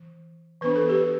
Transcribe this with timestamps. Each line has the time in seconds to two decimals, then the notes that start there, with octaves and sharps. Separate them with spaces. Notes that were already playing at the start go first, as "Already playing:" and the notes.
Already playing: E3
0.61 E3 B3 D4 B4
0.76 A4
0.89 G4 B4